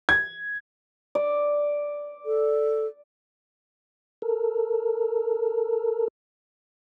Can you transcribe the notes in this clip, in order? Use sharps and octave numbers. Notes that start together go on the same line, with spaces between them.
G#6
D5
A4
A4 A#4